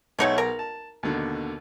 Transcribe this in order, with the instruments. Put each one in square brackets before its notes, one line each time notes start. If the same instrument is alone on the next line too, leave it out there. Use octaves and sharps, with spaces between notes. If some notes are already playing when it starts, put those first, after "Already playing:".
[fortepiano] B1 G#4 F#5 [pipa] A3 D#4 C#5
[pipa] A#4 A#5
[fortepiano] A5
D#2 B2 D3